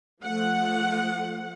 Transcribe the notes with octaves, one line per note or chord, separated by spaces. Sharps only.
F3 A3 F#5